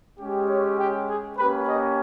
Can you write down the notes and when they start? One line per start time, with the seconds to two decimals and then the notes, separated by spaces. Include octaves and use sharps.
0.19 G#3 C#4 G4
0.49 C#5
0.78 G4
1.08 G#4
1.37 A#3 C#4 G4 B4
1.67 D#5